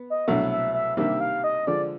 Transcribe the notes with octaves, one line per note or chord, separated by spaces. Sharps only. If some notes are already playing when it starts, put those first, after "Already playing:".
Already playing: B3
D#5
C2 B2 F#3 A3 D4 E5
E5
E5
C3 D#3 G3 A#3 D4 E5
F5
D#5
D3 F3 G#3 D5